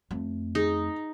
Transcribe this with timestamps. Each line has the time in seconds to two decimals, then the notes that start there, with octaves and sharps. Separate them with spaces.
0.11 F2 A3
0.55 D#4 G#4